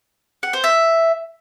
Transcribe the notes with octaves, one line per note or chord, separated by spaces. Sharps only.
F#5
C5
E5